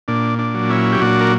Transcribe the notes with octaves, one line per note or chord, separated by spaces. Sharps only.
A#2 D4
D4
F#3
C#4 E4
G4
A#2 D4 F#4
A#4